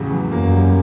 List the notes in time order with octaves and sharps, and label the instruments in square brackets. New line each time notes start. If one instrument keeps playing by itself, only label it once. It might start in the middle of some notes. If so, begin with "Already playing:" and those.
Already playing: [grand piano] E2 A2 C#3 F#3
E2
[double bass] F#2 [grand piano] A#3
[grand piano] G3